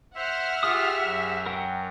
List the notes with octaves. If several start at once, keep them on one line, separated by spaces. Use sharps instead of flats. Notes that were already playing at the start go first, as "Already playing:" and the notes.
C5 E5 F#5 F6
F4 G4 G#4 D#6
F#2
A#4 F#5 G5